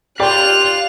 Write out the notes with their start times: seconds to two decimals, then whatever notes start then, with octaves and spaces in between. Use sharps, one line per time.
0.20 G4 D5 F5 C6 F#6 F7